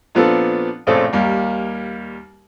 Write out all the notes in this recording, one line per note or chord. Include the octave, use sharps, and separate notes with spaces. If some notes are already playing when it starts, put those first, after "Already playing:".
A#2 F3 B3 C4 D4 A4
A#1 A2 C#3 A3 C4 A4
D#2 G3 A#3